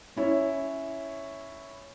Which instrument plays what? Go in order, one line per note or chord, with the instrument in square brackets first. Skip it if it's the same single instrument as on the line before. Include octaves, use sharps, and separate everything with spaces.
[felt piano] C#4 E4 C#5